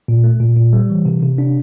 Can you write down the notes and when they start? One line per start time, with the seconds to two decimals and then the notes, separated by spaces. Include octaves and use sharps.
0.08 A#2
0.24 A3
0.40 A#2
0.57 A#2
0.73 G3
0.90 E3
1.06 C3
1.23 C3
1.38 D4